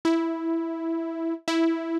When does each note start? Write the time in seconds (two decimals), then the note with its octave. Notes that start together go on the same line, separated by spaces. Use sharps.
0.05 E4
1.48 E4